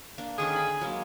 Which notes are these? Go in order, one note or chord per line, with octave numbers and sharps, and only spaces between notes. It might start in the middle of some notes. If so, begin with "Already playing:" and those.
A#3 D4
D3 D#3 C#4 G#4
D5 B5
F#3 G#3 A#3